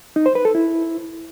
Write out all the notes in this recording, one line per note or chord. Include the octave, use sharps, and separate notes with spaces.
D#4
C5
B4
A4
E4